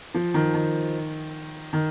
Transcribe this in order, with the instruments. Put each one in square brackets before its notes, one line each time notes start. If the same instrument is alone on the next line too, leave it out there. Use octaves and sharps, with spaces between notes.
[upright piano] F3
D#3
D#3
D#3